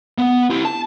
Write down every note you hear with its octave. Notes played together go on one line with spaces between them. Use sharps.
B3
E4 G4
A5